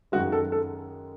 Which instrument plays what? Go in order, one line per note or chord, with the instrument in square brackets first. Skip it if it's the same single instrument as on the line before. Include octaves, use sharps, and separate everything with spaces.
[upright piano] F#2 D#3 G#3 F#4
A4
A4